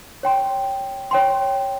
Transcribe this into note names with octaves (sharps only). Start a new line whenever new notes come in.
C#5 G5 C6
C#5 G5 C6